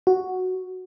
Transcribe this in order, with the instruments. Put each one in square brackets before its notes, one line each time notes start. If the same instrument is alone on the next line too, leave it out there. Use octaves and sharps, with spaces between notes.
[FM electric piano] F#4